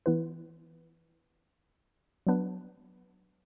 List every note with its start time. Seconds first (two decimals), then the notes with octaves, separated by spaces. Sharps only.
0.06 E3 B3 E4 B4
2.27 F#3 B3 D4 B4